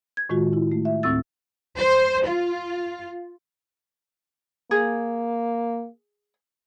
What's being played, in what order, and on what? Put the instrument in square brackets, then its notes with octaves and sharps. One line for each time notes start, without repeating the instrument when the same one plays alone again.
[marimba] G#6
A2 D#3 G#3 F4 F#4
E4
A3
E5
D2 A2 C4 E6 A6
[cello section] C5
F4
[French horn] A#3 [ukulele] G#4